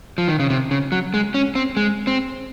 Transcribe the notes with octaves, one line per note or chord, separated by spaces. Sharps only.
F3
D#3
C#3
C3
C#3
F#3
G#3
C#4
C4
G#3
C4